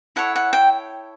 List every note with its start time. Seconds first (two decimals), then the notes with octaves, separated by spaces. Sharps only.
0.16 E4 A4 C#5 F#5
0.36 F#5
0.53 G5